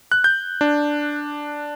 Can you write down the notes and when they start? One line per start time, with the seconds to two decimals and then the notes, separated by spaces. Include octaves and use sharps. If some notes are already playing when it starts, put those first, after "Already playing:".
0.12 F#6
0.24 G6
0.61 D4